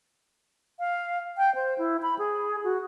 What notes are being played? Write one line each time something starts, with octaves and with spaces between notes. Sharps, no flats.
F5
G5
C5
E4
B5
G#4
F#4